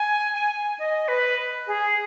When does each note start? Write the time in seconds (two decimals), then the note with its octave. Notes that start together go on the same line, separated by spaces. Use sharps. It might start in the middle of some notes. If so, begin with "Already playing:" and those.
Already playing: G#5
0.34 G#5
0.79 D#5
1.08 B4
1.67 G#4